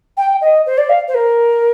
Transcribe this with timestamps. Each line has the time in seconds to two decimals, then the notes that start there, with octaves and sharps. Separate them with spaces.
0.17 G5
0.41 D#5
0.66 C5
0.78 D5
0.89 F5
1.08 C5
1.14 A#4